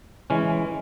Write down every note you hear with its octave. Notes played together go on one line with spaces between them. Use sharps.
E3 G#3 C#4